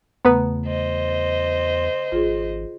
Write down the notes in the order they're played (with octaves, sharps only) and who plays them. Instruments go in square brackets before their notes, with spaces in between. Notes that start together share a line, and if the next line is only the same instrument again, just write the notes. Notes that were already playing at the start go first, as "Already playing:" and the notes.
[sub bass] E2 [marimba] C#3 A3 A#5 [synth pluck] B3 B4
[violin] C5 D#5
[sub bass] G#1 [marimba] F4 G#4